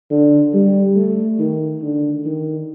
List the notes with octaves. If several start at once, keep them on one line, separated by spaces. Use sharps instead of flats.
D3
G3
A3
D#3
D3
D#3